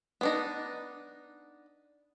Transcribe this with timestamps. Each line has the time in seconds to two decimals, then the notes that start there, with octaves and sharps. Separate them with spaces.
0.21 B3 D4 D#4